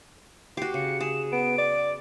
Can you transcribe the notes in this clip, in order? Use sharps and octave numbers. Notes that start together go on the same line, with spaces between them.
F#4 G4 C7
C#3 C#7
G#4 E7
B3 D7
D5